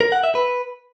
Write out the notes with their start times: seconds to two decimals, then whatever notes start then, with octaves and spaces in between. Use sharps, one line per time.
0.01 A#4
0.12 F#5
0.24 E5
0.35 B4